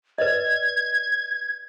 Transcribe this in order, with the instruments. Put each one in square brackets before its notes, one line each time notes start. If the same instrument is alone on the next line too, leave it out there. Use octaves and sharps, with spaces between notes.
[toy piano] B4 D5 D#5 [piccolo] G#6